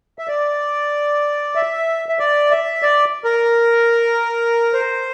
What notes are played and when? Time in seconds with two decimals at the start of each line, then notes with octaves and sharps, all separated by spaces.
0.19 E5
0.28 D5
1.55 E5
2.09 E5
2.19 D5
2.51 E5
2.83 D5
3.24 A#4
4.74 C5